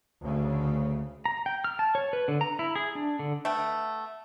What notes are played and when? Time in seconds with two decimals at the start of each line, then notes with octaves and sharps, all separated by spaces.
0.22 D2 C#3
1.25 A#5
1.46 G5
1.64 F6
1.79 A5
1.95 C#5
2.13 B4
2.28 D3
2.41 A#5
2.59 E4
2.76 G#4
2.95 D4
3.19 D3
3.45 A3 B3 G5